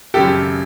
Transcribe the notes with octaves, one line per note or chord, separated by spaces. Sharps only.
G#1 F#2 C#3 G4 A4